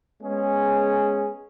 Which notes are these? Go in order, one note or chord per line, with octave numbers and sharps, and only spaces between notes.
G#3 B3 C#4 G#4